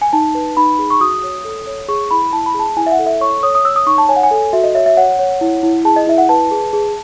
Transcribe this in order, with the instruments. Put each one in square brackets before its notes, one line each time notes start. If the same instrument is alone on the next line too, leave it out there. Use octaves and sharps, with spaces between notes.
[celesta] G#5
D#4 A5
B4
D#4 B5
G#4
C#6
F#4 D#6
C#5
A4
C#5
G#4 C#6
E4 B5
E4 A5
B5
G#4 A5
E4 G#5
E5
F#5
A4
E5
C#5 C#6
C#5 D#6
D#6
C#5 E6
D#6
D#4 C#6
A5
C#5 G#5
F#5
G#5
A4
F#4 E5
D#5
C#5 E5
E5
C#5 F#5
C#5
E4
E4
G#4 A5
D#5
E4 E5
F#5
B4 A5
G#4
G#4